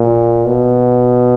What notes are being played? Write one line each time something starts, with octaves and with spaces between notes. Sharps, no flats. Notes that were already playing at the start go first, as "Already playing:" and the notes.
Already playing: A#2
B2